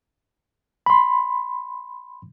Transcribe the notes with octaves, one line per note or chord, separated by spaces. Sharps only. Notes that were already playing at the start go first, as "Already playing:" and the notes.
B5 C6